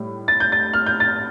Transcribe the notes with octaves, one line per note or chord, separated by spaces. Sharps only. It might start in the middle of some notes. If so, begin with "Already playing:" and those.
Already playing: A2 G3
A6
G6
A6
F6
G6
A6